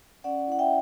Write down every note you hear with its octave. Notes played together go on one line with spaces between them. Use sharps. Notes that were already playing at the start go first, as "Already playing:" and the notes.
C#4 D5 F#5
E4 F#5
E5 G5